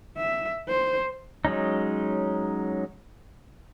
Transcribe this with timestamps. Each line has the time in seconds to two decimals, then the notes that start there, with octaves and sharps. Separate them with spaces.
0.17 E5
0.68 C5
1.45 F#3 G#3 C#4 D#4